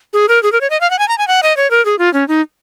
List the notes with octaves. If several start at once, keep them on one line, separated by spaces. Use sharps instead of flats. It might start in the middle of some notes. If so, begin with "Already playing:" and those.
G#4
A#4
G#4
A#4
C#5
D#5
F5
F#5
G#5
A#5
G#5
F#5
D#5
C#5
A#4
G#4
F4
C#4
D#4